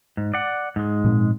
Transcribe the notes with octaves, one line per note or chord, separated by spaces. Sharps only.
G#2
D5 F#5
G#2 G#3
A#2 F3 C4